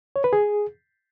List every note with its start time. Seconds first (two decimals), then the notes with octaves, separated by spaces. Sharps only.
0.16 C#5
0.24 B4
0.33 G#4